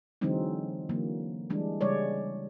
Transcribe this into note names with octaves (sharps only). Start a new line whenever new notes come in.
D3 E3 F#3 G#3 C4 D#4
D3 E3 F#3 A#3
E3 G3 G#3 D4
C#3 G3 G#3 C#5 D5